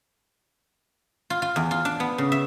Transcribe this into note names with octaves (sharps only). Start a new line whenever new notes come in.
F4
F4
E2
F4
D4
B3
C#3
E5